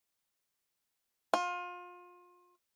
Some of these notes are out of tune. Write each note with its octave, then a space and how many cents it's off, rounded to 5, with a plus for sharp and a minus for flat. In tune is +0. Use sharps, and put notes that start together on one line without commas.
F4 +30